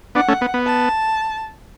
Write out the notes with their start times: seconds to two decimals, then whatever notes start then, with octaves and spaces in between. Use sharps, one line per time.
0.15 B3 D4 F#5
0.28 A3 C#4
0.41 B3
0.54 B3
0.66 A5